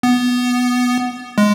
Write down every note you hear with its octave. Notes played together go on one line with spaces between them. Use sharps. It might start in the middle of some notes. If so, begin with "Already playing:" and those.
B3
G#3